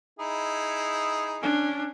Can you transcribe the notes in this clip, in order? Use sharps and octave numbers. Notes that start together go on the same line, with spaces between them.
D#4 E4 G#4
C#4 D4